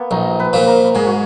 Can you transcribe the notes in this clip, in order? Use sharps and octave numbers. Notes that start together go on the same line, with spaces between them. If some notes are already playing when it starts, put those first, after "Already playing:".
Already playing: A#3 B3
A#1 D#4
B4
A#2 F3
A#4
G#2 G#4
F#4